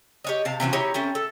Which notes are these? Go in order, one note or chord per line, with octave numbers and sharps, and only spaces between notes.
G4 C#5 D#5
C3 F5 A5
C3 E3 C#4 F#4
D#4 E4 G4 C#5
A3 C4 C#4
A4